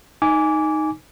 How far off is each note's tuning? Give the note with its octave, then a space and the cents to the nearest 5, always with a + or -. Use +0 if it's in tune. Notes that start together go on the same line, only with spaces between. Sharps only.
D#4 +0 G#5 +0 D6 -20